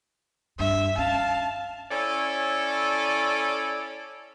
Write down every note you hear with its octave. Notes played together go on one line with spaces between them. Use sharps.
G2 E5
C#4 F5 A5
C#4 E4 A4 C#5 D5